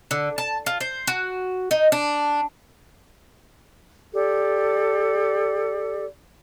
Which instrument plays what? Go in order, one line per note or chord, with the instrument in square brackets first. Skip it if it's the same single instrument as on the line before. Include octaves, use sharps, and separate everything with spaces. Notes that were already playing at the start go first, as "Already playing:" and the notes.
[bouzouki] D3
A5
F4
C5
F#4
D#4
D4
[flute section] G4 A4 D5